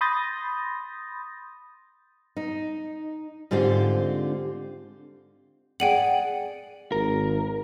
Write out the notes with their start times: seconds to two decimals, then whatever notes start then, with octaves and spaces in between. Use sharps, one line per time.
0.01 B5 C6 D#6 G6 A6 A#6
2.37 D#4
3.51 G#2 D3 C4 F4 G4
5.80 G#4 D5 F#5 G5 D#7 F#7
6.92 G#1 A#4